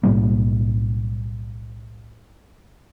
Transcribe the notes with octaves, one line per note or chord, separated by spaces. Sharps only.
B1 A2 G3 A#3